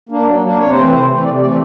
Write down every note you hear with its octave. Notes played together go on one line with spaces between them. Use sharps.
A#3 D4
F#3
A#3 D4
C3 C#5
C5
E3 A3 C4
B4
C3 C5
E3 A3 C4
C3 D5
E3 A3 C4 D5